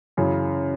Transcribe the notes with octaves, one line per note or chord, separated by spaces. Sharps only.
F#2 C#3 E3